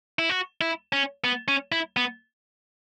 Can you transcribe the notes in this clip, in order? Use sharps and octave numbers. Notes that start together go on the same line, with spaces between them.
E4
F#4
E4
C#4
B3
C#4
E4
B3